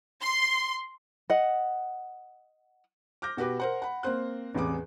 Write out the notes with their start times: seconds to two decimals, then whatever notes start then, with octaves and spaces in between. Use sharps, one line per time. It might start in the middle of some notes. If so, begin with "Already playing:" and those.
0.23 C6
1.30 D#5 F#5
3.22 D6 F6 G6 A#6
3.37 B2 F#4 G4 B4 D6
3.60 A#4 C5 F#5
3.82 F#5 B5
4.03 A#3 C4 C5 F#6
4.54 A1 E2 C3 G#4 D6